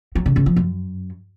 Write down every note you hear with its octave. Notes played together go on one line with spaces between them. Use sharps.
F#3
C#3
C#3
F3
F#2